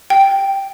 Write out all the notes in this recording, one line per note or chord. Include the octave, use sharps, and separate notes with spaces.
G5